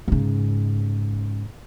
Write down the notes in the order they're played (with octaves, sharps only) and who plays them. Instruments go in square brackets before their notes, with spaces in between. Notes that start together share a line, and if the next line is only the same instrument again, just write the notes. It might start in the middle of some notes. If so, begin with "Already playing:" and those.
[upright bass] G#2 C#3